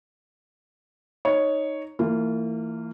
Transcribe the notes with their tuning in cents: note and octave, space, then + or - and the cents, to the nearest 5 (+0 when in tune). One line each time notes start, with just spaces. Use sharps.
D#4 +0 C#5 +0
E3 +0 A#3 -40 F4 -10